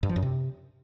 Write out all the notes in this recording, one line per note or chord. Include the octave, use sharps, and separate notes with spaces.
G2
F3
F#2
C3